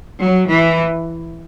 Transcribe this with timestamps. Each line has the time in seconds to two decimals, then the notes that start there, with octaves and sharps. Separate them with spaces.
0.22 F#3
0.51 E3